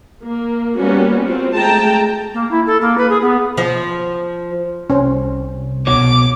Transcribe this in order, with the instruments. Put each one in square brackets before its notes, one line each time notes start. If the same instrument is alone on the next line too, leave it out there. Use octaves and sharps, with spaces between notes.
[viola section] A#3
G3 A#3 B3 C#4 F#4
C4 F4
G#3 A3 G5 A5 A#5
[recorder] A#3
E4
A4
A#3
B4
G#4
B3
[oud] F3
[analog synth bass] C2 [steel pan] C#4 C5
[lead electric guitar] B2 C#5 [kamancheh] D6